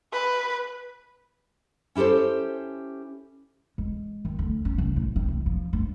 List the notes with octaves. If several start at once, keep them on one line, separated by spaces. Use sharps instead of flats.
B4
C#4 E4 G4 A4 C5
G#3
D#3
D2
C#4
C2
A1
D#3
C2
F3
G2